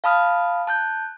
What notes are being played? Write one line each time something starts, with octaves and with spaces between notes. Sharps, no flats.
F5 A5 B5 D#6 F6
A5 F#6 G6